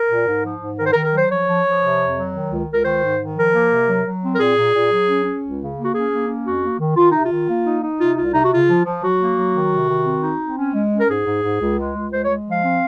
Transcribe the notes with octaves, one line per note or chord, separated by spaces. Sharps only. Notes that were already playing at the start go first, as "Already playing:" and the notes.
Already playing: A#4
A#2
G#2
F3
G#2
D#3 A#4
C5
A#4
D#3
A#4
F#3 C5
F3 C#5
F3
F3
C3
F2
F#3
D#3
C#2
C#2
A#4
D#3 C5
G#2
D#3
F3 A#4
A#3
C3
F#3
F#3
C4
A#4
A#2 G#4
A#2
A#2
F#3
C#4
C#4
C#2
C#3
A#3
F#4
C#4 G#4
A#3
C#4
F2 F#4
A#3
D#3
D#3 F4
C3 D#4
F4
D#3
A#3
D#4
D#4
C3 F4
C2 F4
C3 D#4
F#4
C#3 F4
F3
F3
F#3 F#4
A#3
F#3
D#3
C3
D#3
C4
D#4
C4
C#4
G#3
C#4
A#4
G#2 G#4
G#2
G#2
C#2
G#3
C#2
G#3 C5
C#5
G#3
F3 F5
C4